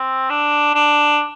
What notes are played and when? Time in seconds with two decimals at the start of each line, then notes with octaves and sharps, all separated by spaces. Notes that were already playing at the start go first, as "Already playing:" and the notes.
Already playing: C4
0.30 D4
0.75 D4